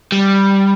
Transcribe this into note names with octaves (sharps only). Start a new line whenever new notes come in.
G3